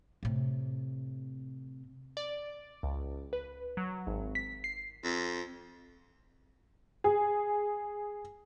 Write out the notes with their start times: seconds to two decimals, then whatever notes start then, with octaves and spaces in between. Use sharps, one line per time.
0.23 A2 C3
2.17 D5
2.83 C#2
3.33 B4
3.77 F#3
4.07 G#1
4.35 B6
4.64 C7
5.04 F2
7.04 G#4